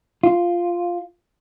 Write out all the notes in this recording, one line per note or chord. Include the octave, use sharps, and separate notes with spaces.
F4